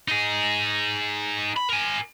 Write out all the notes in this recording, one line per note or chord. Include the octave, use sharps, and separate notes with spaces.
D#4 G#4
B5
A#4 G#5